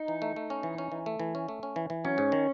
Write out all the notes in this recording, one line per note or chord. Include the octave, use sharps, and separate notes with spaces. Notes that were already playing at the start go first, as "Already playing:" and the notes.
Already playing: D#4
E3
A3
A3
C#4
E3
C#4
E3
A3
E3
C#4
A3
C#4
E3
E3
F#3 C#4
G#2
D#3